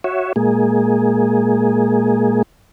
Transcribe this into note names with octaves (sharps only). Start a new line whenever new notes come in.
F#4 C#5 E5
A#2 G#3 A#3 G#4